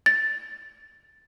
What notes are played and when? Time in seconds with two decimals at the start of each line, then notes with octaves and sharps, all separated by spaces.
0.06 A6